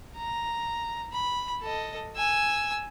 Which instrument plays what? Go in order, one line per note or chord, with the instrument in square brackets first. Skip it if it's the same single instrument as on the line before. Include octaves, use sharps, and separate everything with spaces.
[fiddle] A#5
B5
A4 D#5
G#5 E6